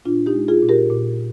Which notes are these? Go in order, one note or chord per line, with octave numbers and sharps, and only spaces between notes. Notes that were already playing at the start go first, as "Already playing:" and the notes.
A#2 D4 F4
D#4 G4
G#3
F4 G#4
A#2
G4 A#4
A#2